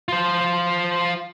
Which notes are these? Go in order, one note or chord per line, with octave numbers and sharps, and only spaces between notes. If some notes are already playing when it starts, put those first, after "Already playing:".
F4 C5